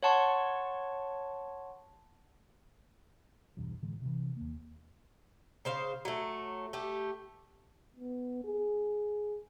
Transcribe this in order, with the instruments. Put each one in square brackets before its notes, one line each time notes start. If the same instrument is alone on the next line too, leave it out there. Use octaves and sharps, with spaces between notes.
[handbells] C#5 F#5 A5 C6 C#6
[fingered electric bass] B1 E2 G2
A2 D3 E3 G#3
C3 E3
D#2 A#3
[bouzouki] C#3 C5 F5
F#3 A3
A3 G4
[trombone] B3
G#4